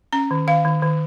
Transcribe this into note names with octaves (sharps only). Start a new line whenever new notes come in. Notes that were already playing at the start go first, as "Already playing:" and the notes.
C#4 A#5
D#3
D#3 F5
D#3
D#3